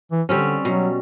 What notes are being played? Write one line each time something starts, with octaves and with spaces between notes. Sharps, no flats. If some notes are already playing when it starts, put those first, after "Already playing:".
E3
D3 G3 C4 C#4
B2 F#3